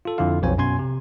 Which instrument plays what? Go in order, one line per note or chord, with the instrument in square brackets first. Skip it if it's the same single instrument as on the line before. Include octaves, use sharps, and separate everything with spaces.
[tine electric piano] F4 A4
F2 D3 E4 F4 F5
B1 F2 C5 C#5 G#5
F#2 B2 C#4 G#5 C6 G#6
C3